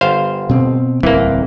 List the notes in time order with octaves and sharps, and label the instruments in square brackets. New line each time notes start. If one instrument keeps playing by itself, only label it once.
[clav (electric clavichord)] G1 C5 F5
[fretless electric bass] B2 C4
[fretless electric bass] D1 C2 C4 [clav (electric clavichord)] E3 A#3